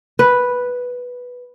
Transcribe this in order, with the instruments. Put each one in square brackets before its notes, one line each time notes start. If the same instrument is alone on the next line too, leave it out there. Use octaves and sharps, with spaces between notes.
[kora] B4